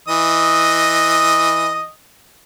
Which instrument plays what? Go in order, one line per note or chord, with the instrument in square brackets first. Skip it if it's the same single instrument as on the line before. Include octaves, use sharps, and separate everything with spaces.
[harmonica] E3 D#5 D#6